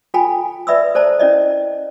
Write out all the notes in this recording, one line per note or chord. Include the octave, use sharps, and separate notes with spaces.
F4 A4 G5 G#5 A#5 B5
B4 D5 E5 B5 D#6 E6
A4 C5 D5 A5 A#5
C#4 E4 D5 D#5